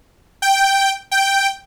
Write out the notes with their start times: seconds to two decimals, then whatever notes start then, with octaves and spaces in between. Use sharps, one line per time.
0.42 G5
1.11 G5